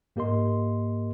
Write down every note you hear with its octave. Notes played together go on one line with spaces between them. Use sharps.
G#2 A#3 G4 A#4 D#5 C6